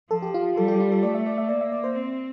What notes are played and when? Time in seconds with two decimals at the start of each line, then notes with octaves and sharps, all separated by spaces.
0.11 F3 A4
0.22 G4
0.34 F4
0.57 G3 A4
0.68 G4
0.80 F4
0.92 A4
1.03 A3 D5
1.14 E5
1.27 D5
1.38 E5
1.49 A#3 D5
1.61 E5
1.72 D5
1.84 C5
1.95 C4